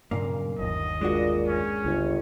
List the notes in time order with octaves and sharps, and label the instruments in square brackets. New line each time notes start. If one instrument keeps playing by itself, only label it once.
[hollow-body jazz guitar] B1 A#3 [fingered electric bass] G2 A#2 C#3
[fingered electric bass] G1 D#2 [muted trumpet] D#5
[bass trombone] A#2 [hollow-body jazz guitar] G#3 D4 F#4
[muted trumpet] C#4
[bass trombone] G1 [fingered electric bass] C#2